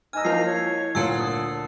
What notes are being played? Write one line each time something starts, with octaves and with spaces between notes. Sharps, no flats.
D#4 D#5 G#5 E6 F6
F3 A#3 E4 F4 C7
C#5
D2 A#2 A#4 A5 E6
D#6